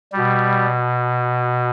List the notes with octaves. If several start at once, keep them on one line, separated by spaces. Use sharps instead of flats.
B2 G3